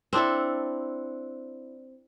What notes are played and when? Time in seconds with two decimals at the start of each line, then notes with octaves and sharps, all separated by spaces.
0.13 C4 D4 E4 A4